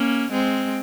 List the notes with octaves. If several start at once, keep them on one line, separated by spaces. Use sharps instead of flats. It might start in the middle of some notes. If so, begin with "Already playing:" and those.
Already playing: A#3 C#4
G#3 C4